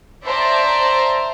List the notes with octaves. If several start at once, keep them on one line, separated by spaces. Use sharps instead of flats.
C5 D5 E5 A5 A#5